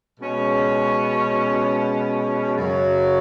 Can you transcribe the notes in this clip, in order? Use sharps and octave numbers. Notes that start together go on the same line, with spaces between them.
B2 G#3 C#4
F#2 C#3 F#3